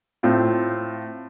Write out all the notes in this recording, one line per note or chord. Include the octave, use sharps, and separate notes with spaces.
A2 C4 F4